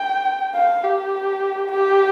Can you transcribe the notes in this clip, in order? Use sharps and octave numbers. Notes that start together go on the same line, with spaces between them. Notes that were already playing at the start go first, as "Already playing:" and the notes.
Already playing: G5
F5
G4
G4